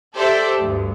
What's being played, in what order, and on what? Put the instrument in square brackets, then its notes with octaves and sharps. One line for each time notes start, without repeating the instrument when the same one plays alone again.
[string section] G4 A4 C5 D5 E5
D2 G2